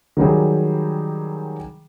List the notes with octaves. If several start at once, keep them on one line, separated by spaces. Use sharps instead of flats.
D#3 F#3 G3 G#4